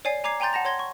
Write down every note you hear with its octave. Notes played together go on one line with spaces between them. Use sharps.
C#5 D5 G#5 C7
G#5 A#5 D6 G#6 C7
G5 G#5 A#5 C6 G6 A6
F#5 A5 A#6 F7
C#5 C6 G#6 A#6 G7
C#6